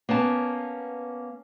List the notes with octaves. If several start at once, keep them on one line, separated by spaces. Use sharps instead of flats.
A#3 B3 C#4 A5